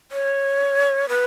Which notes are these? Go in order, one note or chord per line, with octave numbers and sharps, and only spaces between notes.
C#5
B4